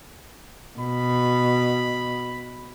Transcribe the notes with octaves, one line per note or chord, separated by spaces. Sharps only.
B2 B5